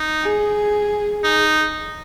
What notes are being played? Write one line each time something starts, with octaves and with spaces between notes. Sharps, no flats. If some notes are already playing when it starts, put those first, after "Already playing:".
Already playing: D#4
G#4
D#4